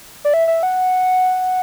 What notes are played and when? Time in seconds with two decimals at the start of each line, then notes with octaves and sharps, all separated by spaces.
0.25 D5
0.34 E5
0.48 E5
0.63 F#5